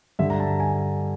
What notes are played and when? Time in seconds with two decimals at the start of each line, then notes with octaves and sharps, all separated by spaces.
0.19 G2 D3 G3 E5
0.30 A#5
0.40 A5
0.60 G#5